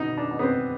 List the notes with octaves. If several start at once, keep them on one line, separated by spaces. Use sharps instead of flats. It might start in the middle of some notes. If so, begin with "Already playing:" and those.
Already playing: B2 D#4
D4
B2
B3
C4